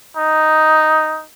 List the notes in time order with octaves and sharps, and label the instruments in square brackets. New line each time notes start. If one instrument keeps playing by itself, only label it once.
[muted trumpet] D#4